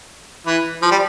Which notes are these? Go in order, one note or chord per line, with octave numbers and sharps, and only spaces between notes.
E3
F3
G3